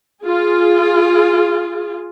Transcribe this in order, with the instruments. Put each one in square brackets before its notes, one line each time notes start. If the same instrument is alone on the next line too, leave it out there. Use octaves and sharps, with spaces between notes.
[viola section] F4 G#4